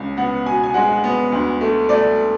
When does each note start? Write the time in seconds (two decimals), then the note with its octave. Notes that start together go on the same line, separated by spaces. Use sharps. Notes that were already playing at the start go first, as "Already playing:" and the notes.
Already playing: C#2
0.17 B3 F#5
0.46 B2 G#5
0.64 G#5
0.74 G#3 F#5
1.04 B3
1.32 D2
1.61 A3
1.89 A3 D5